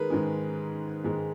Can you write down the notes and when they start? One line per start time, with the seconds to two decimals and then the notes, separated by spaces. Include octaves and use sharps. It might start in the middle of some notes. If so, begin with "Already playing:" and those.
Already playing: D#3 G#3 G#4 A#4 B4
0.10 G#2 D#3 G#3
1.04 G#2 D#3 G#3